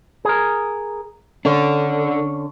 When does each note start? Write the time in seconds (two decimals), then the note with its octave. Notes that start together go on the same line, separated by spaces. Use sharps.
0.25 G#4 A#4
1.45 D3 C#4 D4 A4